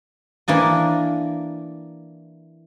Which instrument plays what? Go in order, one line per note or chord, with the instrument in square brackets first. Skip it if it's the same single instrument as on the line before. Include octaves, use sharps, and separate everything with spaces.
[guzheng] E3 A#3 D4 D#5